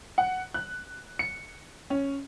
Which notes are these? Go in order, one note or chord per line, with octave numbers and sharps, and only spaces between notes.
F#5
F#6
C#7
C#4